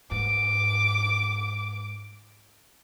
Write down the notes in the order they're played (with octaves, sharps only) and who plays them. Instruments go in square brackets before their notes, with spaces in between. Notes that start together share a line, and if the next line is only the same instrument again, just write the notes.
[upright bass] G#2 [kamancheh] D6